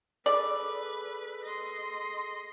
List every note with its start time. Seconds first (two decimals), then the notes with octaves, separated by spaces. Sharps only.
0.26 G#4 A4 B4 D5
1.44 D#5 C6